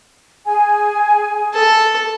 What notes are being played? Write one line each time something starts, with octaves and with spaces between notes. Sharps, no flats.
G#4 G#5
A4